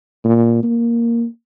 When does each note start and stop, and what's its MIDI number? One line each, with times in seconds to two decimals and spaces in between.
0.24 0.59 46
0.63 1.25 58